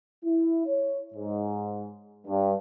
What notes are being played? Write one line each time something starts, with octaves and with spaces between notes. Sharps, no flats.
E4
C#5
G#2
G2